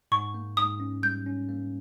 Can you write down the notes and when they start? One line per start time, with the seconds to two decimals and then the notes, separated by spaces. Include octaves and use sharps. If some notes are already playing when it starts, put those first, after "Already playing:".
0.12 G#2 C#6
0.34 A#3
0.57 G#2 D#6
0.80 C#4
1.03 G3 G6
1.26 C#4
1.49 A#3